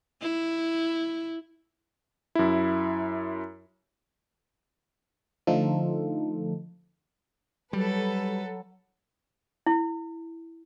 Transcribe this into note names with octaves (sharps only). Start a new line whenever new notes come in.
E4
F#2 E4
D3 F3 A3 D#4 F4 A4
F#3 G3 A4 B4
E4